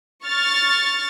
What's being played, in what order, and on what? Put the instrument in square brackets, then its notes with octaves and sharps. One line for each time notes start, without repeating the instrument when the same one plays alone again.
[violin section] C#6 F6 A6